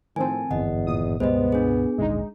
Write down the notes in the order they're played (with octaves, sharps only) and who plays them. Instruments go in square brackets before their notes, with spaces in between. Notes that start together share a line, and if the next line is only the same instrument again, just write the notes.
[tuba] A2 [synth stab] D#3 F3 C4 [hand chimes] G#5 A5
[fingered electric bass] G#1 G2 D3 [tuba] E2 [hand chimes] D#5 F#5
[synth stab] A#2 D#6
[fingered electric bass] C#2 G2 B2 [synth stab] G3 G#3 [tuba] B3 [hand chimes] C5 D#5
[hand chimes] D4 G#4
[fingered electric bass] G#1 D2 A#2 [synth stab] G#3 D#4